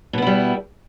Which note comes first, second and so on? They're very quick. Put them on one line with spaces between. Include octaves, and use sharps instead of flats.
B2 B3 E4 G3